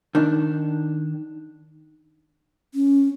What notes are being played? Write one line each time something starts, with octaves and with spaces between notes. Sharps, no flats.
D#3 D4
C#4